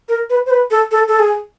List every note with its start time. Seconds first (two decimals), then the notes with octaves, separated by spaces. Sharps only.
0.09 A#4
0.30 B4
0.46 C5
0.50 B4
0.71 A4
0.91 A4
1.08 A4
1.19 G#4